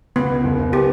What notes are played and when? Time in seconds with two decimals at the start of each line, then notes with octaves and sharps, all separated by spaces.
0.16 C#2 B3
0.30 C#2
0.44 F#1
0.59 F#1
0.72 B3 G4